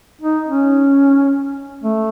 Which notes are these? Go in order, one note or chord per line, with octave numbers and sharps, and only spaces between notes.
D#4
C#4
A3